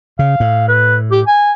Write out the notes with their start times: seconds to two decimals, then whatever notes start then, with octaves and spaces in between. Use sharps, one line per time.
0.19 C#3 F5
0.40 A2
0.68 B4
1.11 G4
1.27 G#5